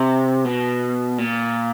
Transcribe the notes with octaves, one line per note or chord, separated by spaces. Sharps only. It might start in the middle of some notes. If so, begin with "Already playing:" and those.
Already playing: C3
B2
A#2